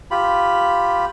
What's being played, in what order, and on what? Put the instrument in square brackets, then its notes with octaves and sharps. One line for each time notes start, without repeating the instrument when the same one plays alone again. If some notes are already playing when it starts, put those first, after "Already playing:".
[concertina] F4 G4 B5